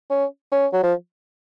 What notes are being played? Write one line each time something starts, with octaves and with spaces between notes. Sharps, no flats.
C#4
C#4
F#3
F3